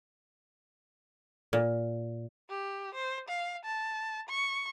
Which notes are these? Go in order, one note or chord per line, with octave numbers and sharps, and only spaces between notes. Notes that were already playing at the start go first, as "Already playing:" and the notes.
A#2
G4
C5
F5
A5
C#6